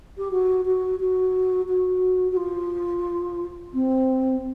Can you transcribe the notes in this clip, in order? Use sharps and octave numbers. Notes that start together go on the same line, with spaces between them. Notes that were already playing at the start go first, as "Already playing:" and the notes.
G4
F#4
F#4
F#4
F#4
F#4
F4
C4